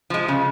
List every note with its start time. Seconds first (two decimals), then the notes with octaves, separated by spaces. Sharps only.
0.10 F3 G#3
0.28 C#3